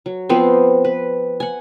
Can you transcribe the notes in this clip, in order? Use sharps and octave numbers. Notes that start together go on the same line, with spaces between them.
F#3
F3 B3 C4 C5
B4
F#5 G#5